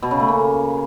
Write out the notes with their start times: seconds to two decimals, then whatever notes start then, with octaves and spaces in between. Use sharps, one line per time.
0.03 B2
0.11 C#3
0.20 A3
0.28 A#3